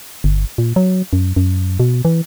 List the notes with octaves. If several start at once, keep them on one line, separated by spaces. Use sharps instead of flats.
G1
A#2
F#3
F#2
F#2
B2
E3